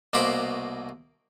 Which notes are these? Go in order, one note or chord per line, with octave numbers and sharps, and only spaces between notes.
C2 B2 A#3 C5 B5 D6